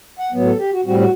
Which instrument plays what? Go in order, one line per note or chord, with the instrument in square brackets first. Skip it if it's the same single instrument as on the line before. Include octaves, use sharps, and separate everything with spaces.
[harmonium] F#5
A2 F#3 B3
A4
G4
F#4
A2 G3 C4 F#4
F#4